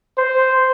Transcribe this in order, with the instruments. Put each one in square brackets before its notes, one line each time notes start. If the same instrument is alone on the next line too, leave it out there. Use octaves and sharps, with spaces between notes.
[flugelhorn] C5